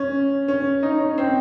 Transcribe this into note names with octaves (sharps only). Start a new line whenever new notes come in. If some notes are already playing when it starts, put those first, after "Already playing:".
Already playing: C#4
C#4
D#4
C#4
C4